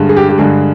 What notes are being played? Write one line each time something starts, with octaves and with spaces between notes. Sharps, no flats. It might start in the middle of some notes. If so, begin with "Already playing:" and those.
Already playing: G2 D3 G#3
G#4
G4
G4
G2 D3 G#3 G#4